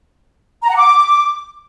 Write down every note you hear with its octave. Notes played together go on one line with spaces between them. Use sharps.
A#5
F#5
D6